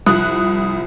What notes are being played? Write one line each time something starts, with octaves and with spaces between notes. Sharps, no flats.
C2 F2 D#6 F#6